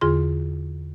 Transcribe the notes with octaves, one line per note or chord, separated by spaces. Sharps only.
E2 D3 F4 G#4 C6